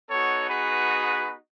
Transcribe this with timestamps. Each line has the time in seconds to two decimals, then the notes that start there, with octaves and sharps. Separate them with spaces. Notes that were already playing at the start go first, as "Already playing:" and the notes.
0.10 B3 D#4 F#4 A4 C#5
0.50 G#4 B4